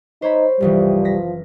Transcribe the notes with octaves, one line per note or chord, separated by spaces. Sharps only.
D#4 C5 C#5 B5
F#1 C2 E3 F3 G3
A#6 B6